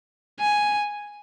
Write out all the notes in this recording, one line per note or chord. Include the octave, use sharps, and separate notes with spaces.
G#5